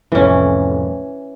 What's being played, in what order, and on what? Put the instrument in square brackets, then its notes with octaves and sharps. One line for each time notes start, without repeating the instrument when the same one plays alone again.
[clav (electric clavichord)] C2 F2 A2 [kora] E3 C#4